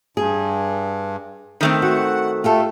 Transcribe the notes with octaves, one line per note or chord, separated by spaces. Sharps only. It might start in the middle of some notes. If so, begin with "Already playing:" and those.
G2 G#4
D#3 A3 C4
F#4 F#5
A3 F4 G4 A4